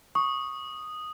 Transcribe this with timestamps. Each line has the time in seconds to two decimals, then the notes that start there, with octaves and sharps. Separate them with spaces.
0.15 C#6 D#6